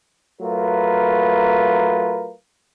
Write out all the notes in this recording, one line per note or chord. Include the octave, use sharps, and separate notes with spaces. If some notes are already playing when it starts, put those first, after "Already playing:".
F#3 A3 F4 A#4 B4